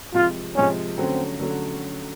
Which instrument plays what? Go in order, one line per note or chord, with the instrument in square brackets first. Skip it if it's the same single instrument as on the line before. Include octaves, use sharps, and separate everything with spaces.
[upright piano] C3 F3 G#3 C4 [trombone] F4
[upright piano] C3 F3 G#3 C4 [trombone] C#4
[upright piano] D3 F#3 A3 C#4 [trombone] C4
[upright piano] D3 F#3 A3 C#4